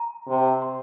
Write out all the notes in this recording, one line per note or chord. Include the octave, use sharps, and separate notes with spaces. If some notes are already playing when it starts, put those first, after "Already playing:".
Already playing: A#5
C3
C6